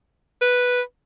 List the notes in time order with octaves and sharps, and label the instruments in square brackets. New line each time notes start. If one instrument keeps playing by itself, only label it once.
[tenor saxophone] B4